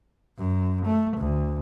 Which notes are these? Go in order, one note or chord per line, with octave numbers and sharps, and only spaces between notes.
F#2
A3
D2